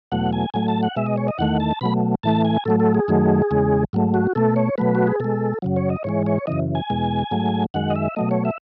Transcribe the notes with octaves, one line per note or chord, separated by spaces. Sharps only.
E2 B2 F#3 A3 F#5
G#5
A2 F#3 A3 G#5
A5
F#5
B2 G#3 E5
D#5
C#5
D#5
E2 D#3 A3 F#5
A5
B2 F#3 A3 B5
A2 E3 A3 A5
G#5
A2 F#3 A3 A4
A4
G#4
F#2 D#3 F#3 A3
E2 C#3 G#3
G#2 F#3 A3
F#4
B2 A3 A4
C#5
B2 F#3 A3 B4
F#4
G#4
B2 G#3 A4
F#2 C#3 F#3
C#5
D#5
G#2 E3 G#3 C#5
C#5
F#2 C#3 E3 D#5
G#5
E2 B2 G#3
G#2 F#3 A3
F#2 D#3 G#3 F#5
D#5
E5
B2 F#3 A3 D#5
C#5
E5